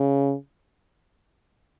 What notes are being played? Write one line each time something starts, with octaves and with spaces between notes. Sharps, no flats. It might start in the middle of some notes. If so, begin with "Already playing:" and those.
Already playing: C#3